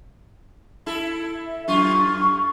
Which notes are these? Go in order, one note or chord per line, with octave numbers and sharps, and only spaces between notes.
E4 A4
E5
F#2 F4 C#6